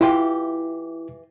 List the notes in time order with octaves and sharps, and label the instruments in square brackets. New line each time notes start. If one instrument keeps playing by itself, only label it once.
[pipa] E3 F4 G4 [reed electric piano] E4